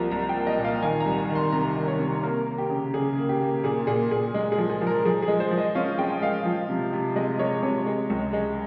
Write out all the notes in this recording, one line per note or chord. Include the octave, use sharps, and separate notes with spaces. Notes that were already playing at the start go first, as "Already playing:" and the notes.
Already playing: C2 F3 A#3 A#5
C2 A#5
G5
A#3
D#5
A#2
F5
D#3 G#5
A#5
C2
A#5
D#3
C6
C3 A#5
D#3
C#5
C3
A#3 A#4
A#3
G4
C#3
C#3 G#4
A#3
G4
A#3
A#2 G#4
A#2 G#4
A#2 G#4
G#3
G#4
F3
G#4
F3
A#4
F3 G#4
G#4
G#3
C5
F3
D#5
C#4 F5
G#3 G5
G#3 F5
F3
C3
C3
G#3 D#5
G#3 C#5
C3 C#5
G#3
C#2
G#3